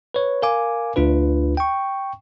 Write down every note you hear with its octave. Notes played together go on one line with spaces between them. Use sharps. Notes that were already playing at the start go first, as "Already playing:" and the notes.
B4 C#5
A#4 F5 G#5 D6
D2 D4 F4 B4
G5 C#6